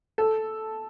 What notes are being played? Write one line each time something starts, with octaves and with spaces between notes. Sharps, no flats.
A4